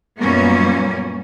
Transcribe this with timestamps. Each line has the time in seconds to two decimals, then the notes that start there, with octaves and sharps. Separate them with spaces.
0.20 F#2 A#2 G3 A#3 B3 C#4